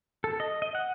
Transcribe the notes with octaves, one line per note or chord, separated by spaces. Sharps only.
A4
D#5
D#5
F#5